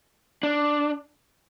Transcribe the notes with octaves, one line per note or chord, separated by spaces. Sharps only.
D4